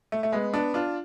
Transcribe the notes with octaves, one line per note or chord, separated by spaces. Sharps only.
A3
A3
G#3 B3
B3 D4
D4 F4